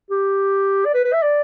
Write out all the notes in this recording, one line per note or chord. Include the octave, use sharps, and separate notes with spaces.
G4
D5
B4
B4
E5
D5